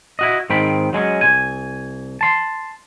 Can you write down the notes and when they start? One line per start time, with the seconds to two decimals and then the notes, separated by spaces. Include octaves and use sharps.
0.19 E4 F#4 D#5
0.50 G#2 D#3 C4 G5 B5
0.93 F#3 G#3 C4 C#4
1.21 C2 G#5
2.21 A5 C6